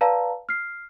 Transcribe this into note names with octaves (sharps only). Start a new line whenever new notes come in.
B4 D5 F5 A5 A#5
F6 C7